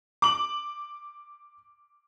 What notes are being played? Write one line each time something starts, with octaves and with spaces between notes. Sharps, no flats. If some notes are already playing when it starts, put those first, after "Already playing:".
D6 F#7